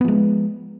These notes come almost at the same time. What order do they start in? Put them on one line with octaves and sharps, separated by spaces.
B3 F3 G#3